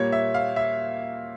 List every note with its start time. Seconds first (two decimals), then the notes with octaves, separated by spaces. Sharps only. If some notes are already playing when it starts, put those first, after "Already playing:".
Already playing: A#2 G3 A#3 C#5
0.12 E5
0.34 F5
0.56 E5